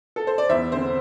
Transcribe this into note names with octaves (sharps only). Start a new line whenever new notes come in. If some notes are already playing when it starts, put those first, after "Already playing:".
A4
C5
D5
E2 C5 E5
D3 C4 C5